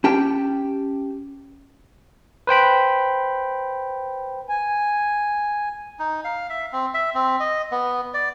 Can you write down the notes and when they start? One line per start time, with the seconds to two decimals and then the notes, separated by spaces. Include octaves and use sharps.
0.04 C#4 G4 G5 A5
2.47 B4 C5 G5 B5
4.49 G#5
5.99 D#4
6.24 F5
6.50 E5
6.73 C4
6.94 E5
7.15 C4
7.40 D#5
7.72 B3
8.14 D5